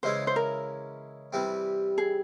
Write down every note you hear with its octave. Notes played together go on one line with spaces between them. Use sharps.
C#3 E3 G#3 C#4 E4 C5
C5
A#4
C3 E3 G3 C4
G#4